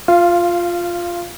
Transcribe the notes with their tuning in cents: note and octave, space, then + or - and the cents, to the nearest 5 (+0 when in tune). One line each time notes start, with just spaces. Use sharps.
F4 +5 F5 -20